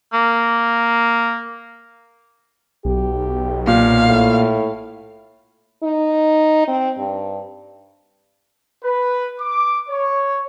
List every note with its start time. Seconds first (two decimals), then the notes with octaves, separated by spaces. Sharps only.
0.13 A#3
2.85 B1 G4
3.67 A#2 F5
4.07 A2
5.83 D#4
6.67 C4
6.97 G2
8.83 B4
9.40 D6
9.88 C#5